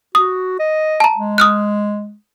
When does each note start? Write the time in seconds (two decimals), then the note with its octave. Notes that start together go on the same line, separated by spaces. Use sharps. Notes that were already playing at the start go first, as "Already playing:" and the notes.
0.15 F#4 D#6
0.59 D#5
1.00 A5 A#5
1.17 G#3
1.38 D#6 F6 F#6